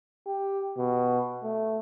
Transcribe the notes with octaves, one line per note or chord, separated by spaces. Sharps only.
G4
B2
A3